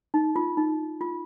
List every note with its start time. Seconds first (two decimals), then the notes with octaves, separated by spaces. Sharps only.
0.14 D#4
0.36 F4
0.57 D#4
1.01 F4